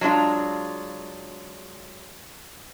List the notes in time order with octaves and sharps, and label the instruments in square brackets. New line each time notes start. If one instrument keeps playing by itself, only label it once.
[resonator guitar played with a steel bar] F#3 G#3 D4 F4